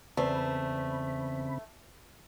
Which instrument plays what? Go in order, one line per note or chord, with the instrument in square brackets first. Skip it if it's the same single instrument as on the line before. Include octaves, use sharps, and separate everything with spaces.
[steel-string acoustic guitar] E2 C5 [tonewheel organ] C#3 C4 B5 [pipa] A3